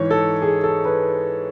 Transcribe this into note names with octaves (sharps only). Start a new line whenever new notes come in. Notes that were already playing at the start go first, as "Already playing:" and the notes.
Already playing: G#2 E3 C#5
A4
G#4
A4
B4